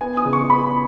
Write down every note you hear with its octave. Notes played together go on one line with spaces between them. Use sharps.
B3 G#5
D#6
C#3
C#6
B3 B5